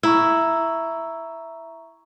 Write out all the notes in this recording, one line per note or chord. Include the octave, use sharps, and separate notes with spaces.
E4 E5 A#5 C#6